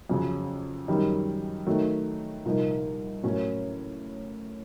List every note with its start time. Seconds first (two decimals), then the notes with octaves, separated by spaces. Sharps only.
0.10 F2 C#3 F#3
0.88 F#2 D#3 G3
1.67 D#3 F#3 A3
2.45 C2 A#2 F3 A#3 D#4
3.23 A2 F#3 A#3 C#4